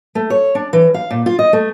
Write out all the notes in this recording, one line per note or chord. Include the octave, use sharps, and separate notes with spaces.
A3
C#5
D4
E3
F5
A#2
F4
D#5
A3